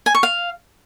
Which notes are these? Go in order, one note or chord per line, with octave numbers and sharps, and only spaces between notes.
G#5
C#6
F5